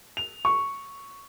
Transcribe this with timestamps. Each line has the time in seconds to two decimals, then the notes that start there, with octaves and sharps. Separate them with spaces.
0.17 F7
0.45 C#6